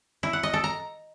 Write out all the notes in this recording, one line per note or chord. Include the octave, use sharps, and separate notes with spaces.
E4
F#5
D#5
A4
A#5